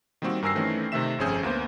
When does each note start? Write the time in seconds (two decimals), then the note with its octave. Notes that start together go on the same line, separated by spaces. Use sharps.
0.22 D#3 G3 A#3 C4 F#4
0.42 G2 A#4 G#5 E6 A#6 C7
0.55 D#3 E3 A3 C4 C#4
0.92 C3 D#3 A3 C4 E5 E7
1.19 G1 F2 C4 C#4 G#4 G6
1.43 D2 A#3 B3 C5